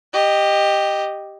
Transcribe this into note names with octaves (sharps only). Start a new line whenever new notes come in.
G4 D#5